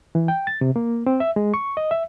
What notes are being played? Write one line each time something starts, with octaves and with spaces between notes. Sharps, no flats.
E3
G5
A6
C3
A#3
C4
E5
G#3
C#6
D#5
E5